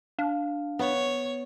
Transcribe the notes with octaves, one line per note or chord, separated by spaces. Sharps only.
D4 F5
B3 C#5